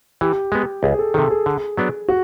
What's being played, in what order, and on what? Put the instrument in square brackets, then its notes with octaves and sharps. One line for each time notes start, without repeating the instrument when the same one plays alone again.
[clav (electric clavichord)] E3 [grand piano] G4
[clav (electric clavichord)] G#3 B3
[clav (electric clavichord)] C#2 [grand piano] G#4
[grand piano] A4
[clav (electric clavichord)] D#3 [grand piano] A4
[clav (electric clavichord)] C3
[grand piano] G#4
[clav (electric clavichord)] D3
F#3 B3 D4
[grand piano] F#4